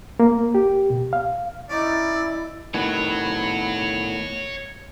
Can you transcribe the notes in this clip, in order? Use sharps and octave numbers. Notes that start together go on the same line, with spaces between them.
A#3
G4
B2
F5
C#4 D#4 E4 D5
A2 D#3 B3 C#5 F#5